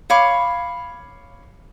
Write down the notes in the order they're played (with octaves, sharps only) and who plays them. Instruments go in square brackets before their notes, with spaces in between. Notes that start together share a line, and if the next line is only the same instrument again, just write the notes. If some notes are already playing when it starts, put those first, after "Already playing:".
[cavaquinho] C#5 F5 B5 D6